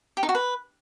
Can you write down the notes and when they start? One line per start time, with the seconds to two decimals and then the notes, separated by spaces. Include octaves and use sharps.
0.17 G4
0.23 D#4
0.29 F#4
0.35 B4